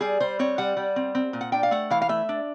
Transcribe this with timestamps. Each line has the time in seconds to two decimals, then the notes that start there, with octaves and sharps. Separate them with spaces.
0.01 G3 G#4
0.20 G3 C5
0.39 C4 C#5
0.58 G3 F#5
0.77 G3
0.96 C4
1.15 C4
1.33 A#2
1.41 F#5
1.52 D4 G5
1.63 F5
1.71 A3 F#5
1.90 E3 F5
2.02 F5
2.09 A3 E5
2.29 D4